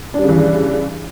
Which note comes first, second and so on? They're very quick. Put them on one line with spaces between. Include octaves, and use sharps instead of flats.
D4 G3 C#3 E3